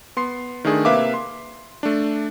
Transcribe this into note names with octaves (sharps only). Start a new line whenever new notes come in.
B3 C6 C7
D#3 A3 D4 G#4
C3 A#3 B4 E5 F5 D6
C6
A3 D4